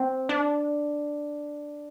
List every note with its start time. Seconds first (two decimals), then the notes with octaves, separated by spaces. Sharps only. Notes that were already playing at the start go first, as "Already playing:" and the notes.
Already playing: C4
0.29 D4